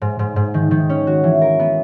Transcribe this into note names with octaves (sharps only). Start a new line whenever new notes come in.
G#2
G#2
G#2
D#3
D#3
C#4
F#4
E3
A#4
B3